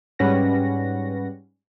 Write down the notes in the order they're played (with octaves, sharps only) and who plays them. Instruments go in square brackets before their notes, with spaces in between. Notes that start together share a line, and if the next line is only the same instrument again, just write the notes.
[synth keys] G#2 G3 C#4 B4 F#5 A#6